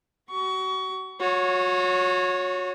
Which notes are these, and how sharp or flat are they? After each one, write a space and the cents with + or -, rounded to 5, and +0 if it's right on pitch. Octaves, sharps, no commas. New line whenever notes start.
F#4 +30 C#6 +25
F#4 -30 C#5 +0